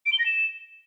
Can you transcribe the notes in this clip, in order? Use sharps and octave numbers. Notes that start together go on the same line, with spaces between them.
D7
G7
A#6
E7